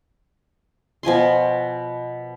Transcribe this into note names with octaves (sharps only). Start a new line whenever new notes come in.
B2 F3 G#5 C6